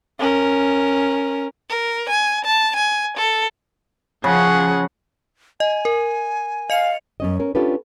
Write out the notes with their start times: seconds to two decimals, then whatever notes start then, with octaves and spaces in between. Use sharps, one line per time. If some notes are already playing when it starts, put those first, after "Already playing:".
0.19 C#4 A#4
1.69 A#4
2.09 G#5
2.45 A5
2.76 G#5
3.17 A4
4.24 C#3 F3 G#4 F#5
5.60 D#5 G#5
5.85 A#4
6.70 D#5 F5 C#7 F7
7.20 F#2 C#4 D#5
7.39 C#4 A#4
7.55 C#4 D4 F4 G4 A4 B4